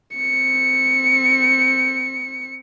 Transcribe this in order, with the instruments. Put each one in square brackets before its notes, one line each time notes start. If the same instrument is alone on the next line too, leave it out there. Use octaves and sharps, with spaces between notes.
[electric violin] C4 C#7